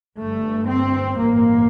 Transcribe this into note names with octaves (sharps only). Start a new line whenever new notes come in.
G1 G2 A3
C4
A1 G2 A#3